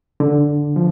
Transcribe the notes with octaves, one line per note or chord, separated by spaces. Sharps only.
D3
F3